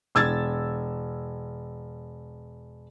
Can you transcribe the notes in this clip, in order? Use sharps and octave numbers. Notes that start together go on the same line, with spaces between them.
E1 E6 G#6 A6